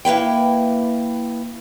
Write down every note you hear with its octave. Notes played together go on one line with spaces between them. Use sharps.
A#3 E4 B4 G5